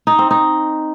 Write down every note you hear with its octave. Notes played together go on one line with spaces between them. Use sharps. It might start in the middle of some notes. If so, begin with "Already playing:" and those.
D#4
C4
D#4